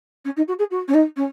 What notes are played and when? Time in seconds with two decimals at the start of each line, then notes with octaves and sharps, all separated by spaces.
0.25 C#4
0.36 D#4
0.48 F#4
0.59 G#4
0.70 F#4
0.88 C#4
0.94 D#4
1.16 C#4